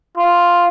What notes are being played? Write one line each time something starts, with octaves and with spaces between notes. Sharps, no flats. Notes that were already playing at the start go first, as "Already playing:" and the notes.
F4